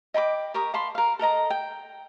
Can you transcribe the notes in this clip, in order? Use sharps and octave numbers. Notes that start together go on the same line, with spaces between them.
D#5 G5 B5 D6
G4 A#4 C#6 D#6
F5 A5 B5 C6
A#4 F5
A4 A#4 D#5 A#5
G5